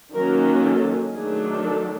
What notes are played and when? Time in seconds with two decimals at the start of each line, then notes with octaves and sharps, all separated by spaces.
0.14 D#3 F#3 A#3 C#4 A#4
0.65 A4
1.13 D#3 F#3 A3 D4 G#4
1.64 A4